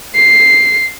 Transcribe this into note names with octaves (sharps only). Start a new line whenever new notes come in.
C7